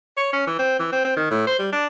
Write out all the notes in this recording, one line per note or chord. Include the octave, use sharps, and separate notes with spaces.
C#5
C#4
E3
C4
E3
C4
C4
D#3
A2
C5
G3
D4